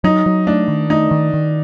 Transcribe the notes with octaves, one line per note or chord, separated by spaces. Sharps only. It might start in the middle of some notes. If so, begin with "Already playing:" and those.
F#3 D#4
F#3
A3 D4
D#3
A3 D#4
D#3
D#3